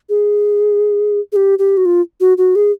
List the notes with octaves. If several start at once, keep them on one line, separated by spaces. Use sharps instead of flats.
G#4
G#4
G4
G4
F#4
F4
F#4
F#4
G#4